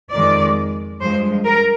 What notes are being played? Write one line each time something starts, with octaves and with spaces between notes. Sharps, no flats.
F2 D#3 G#3 D5
G2 F3 G#3 C5
A#4